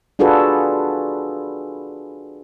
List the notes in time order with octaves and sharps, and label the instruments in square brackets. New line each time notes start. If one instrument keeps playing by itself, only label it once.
[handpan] D4 F4 F#4 G#4 A4 B4